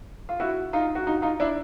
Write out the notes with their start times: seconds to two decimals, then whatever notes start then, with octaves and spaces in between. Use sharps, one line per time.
0.29 F4
0.40 E4 F#4
0.73 D#4 F4
0.95 F#4
1.07 D#4 F4
1.22 D#4 F4
1.40 D4 E4